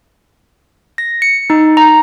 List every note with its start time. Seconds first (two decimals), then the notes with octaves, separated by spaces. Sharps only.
0.98 A#6
1.22 C#7
1.50 D#4
1.77 A#5